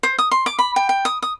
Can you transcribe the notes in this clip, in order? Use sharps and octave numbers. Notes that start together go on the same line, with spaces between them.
C5
D#6
C6
D6
B5
G5
G5
D#6
D#6